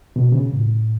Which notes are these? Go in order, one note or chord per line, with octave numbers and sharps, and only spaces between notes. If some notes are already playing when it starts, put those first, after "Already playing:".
B2
C#3
A2